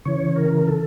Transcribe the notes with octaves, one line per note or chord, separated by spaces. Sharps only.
C#3 E3 C#5
A#4
A4